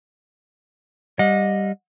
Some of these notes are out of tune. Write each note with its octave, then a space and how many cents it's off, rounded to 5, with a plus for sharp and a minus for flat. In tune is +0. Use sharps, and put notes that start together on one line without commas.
G3 +0 D#5 +0 F#5 -40